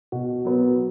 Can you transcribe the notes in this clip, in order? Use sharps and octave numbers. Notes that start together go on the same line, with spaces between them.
B2 F#4
F#3 B3